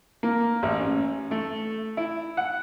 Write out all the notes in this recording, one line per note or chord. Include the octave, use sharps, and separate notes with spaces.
A#3
A1
C#4
A3
E4
F#5